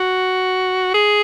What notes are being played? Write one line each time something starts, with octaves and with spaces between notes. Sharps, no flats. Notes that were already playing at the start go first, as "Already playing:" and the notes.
Already playing: F#4
G#4